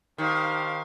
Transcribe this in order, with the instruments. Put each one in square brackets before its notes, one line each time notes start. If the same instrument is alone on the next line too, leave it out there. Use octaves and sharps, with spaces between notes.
[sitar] D#3 [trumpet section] D4 G4 C5 F5